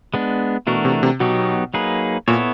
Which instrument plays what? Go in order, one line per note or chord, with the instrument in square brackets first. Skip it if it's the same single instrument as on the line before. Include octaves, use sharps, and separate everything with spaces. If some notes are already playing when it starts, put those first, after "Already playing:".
[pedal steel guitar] G#3 B3 D4
[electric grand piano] B2 [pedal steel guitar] E3 A3 D4 F#4 A#4
[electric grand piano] C3
C3
[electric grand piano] B2 [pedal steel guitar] F#3 B3 D#4 G4
[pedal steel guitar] F#3 A#3 D#4 G#4 B4
[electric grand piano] A#2 [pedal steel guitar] B3 E4 A4 C#5